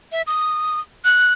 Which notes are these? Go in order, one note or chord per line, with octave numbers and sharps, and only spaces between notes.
E5
D#6
F#6